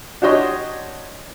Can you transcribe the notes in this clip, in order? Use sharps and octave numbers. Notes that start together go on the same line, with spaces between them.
D4 F#4 G4 C#5 D#5 C6